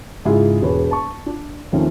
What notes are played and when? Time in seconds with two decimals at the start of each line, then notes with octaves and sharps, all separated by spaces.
0.25 G#2 C#3 E4 F4 G#4
0.61 E1 G#4 B4 C#5
0.91 A5 C#6
1.26 D4
1.72 D#2 F3 A3 C4 C#4 D#4